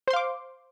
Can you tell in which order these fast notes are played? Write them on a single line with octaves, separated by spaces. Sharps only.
C5 C6 F5 D6